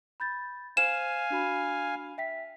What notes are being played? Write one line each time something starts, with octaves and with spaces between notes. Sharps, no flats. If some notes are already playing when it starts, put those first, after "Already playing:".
B5 G6 A6
C5 F5 G#5 E7
D4 F#4 B5
E5 G5 B6